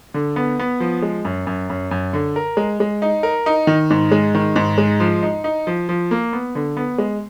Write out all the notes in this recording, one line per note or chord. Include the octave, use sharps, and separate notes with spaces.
D3
B3
B3
F3
G#3
F#2
F#2
F#2
F#2
D3
A#4
G#3
G#3
D#4
A#4
D#4
D#3
G#2
G#3
D#3
G#2
G#3
F3
D#4
D#4
F3
F3
A#3
B3
D3
B3
G#3